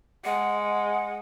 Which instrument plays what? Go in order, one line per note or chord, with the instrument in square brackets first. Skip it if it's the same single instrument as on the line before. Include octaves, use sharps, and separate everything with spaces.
[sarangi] G#3 [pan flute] F#5